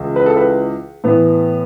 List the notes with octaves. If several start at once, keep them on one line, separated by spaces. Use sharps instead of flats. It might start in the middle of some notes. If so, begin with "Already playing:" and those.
Already playing: C#2 C#3 E3
B4
A4
B4
A2 E3 B3